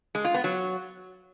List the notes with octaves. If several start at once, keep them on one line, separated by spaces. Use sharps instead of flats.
G#3
F4
B3
F#3